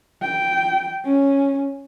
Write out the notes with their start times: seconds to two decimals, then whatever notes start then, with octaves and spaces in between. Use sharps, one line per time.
0.22 G5
1.05 C#4